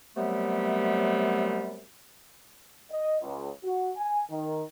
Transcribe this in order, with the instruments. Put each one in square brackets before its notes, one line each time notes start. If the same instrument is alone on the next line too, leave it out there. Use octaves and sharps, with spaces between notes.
[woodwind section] F#2 C3 F#3 G3 A3 B3
[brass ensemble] D#5
C#2
F#4
G#5
D#3